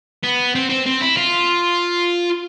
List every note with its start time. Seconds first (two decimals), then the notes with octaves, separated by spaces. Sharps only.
0.23 B3
0.55 C4
0.70 C4
0.86 C4
1.01 E4
1.17 F4